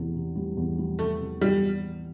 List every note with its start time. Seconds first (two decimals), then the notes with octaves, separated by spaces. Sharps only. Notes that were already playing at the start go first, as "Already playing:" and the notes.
Already playing: E2 C3
0.15 C3
0.36 G3
0.57 E2
0.78 G3
0.99 C3 A3
1.20 C3
1.41 C3 G3